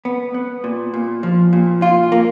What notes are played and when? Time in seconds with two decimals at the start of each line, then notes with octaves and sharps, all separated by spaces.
0.05 B3
0.34 B3
0.64 A#2
0.94 A#2
1.23 F3
1.53 A#2
1.82 F4
2.12 A#3